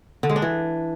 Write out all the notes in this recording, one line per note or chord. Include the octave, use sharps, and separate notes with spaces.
D3
G#3
D4
E3